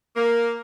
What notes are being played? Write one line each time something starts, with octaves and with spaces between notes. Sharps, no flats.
A#3